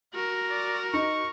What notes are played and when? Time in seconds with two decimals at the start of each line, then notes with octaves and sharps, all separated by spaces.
0.14 F#4 A#4
0.50 D5
0.94 D#4 C#6